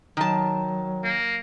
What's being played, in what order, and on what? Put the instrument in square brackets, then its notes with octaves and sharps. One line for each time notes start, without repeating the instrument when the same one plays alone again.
[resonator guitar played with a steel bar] D#3 A5 [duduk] F#3
[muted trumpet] A#3